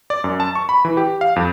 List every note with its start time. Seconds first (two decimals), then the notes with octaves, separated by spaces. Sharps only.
0.10 D5
0.24 F#2
0.40 A5
0.55 C#6
0.69 B5
0.85 E3
0.97 G4
1.21 F5
1.36 F2